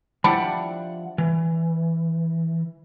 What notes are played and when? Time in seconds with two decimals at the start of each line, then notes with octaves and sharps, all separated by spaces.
0.24 F3 G3 D4 E4 F#5
1.18 E3